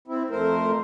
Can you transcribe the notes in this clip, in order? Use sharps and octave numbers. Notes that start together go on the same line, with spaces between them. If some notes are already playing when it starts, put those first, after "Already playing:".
C4 E4
F2 A3 A#4 C5